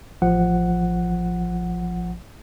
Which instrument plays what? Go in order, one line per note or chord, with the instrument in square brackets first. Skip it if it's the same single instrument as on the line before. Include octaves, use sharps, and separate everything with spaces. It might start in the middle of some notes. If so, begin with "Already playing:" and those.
[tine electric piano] A1 F3 F#5